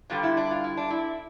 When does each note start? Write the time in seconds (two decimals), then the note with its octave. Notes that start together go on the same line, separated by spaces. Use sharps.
0.10 G2 D3 G3 D4 F4
0.23 E4
0.37 D4
0.51 F4
0.64 E4
0.77 D4
0.90 E4